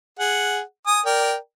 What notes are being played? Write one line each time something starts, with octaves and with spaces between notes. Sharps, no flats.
G#4 F#5
G#5 D#6
A#4 D5 G5